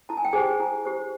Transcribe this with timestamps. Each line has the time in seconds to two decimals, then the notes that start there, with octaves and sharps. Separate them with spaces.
0.09 E4 A5
0.17 G#5
0.25 G5
0.33 G4 G#4 C5 G#5
0.60 E4
0.85 G4 C5